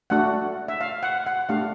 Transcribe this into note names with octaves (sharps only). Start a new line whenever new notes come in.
A3 D4 F#4 F#5
E5
F5
F#5
F#5
A3 D4 G4 F5